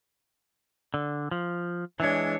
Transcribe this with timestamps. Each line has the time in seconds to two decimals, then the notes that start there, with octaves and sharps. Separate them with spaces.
0.94 D3
1.31 F3
2.00 E3 G#3 D4 C#5